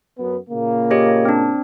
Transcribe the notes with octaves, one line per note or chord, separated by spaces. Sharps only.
F#2 B3
A#2 C#3 A#3
G4 C#5 D#5
C4 D4